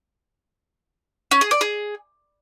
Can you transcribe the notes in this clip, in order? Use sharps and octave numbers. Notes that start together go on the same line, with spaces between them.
C#4
G#4
D5
G#4